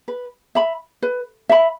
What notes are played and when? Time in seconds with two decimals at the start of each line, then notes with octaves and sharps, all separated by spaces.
0.08 B4
0.55 E5 B5
1.03 B4
1.49 E5 B5